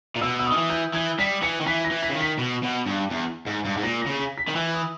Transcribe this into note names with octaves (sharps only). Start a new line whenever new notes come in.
A#2
B2 E6
E6
D#6
D#3
E3
G6
E3 G#6
G3 B6
E3 C#7
D#3
E3 B6
A#6
E3
B6
C#3
D#3
B6
B2
B2
G2
E2
G#2
G2
G#2
A#2 A#6
A#6
C#3
B6
B6
D#3
E3 E6
D#6